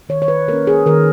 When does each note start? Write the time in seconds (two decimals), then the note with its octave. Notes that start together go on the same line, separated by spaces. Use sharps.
0.09 D#3 C#5
0.22 C#5
0.28 B4
0.48 A#3 C#4 A#4
0.67 G#4
0.86 D#3 A#4